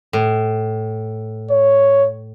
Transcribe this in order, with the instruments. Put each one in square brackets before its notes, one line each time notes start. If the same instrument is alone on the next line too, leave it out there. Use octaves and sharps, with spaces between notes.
[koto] A2
[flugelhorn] C#5